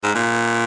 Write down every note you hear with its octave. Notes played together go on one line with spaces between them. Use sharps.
G#2
A#2